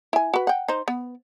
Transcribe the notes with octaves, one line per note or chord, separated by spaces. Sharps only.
E4 G#5
F#4 B4
F#5 G5
D#4 C5
B3